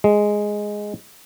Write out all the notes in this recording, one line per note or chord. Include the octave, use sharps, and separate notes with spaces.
G#3